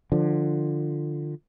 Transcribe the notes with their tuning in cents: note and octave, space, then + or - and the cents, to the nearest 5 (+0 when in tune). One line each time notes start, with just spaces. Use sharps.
D3 +20 F3 +0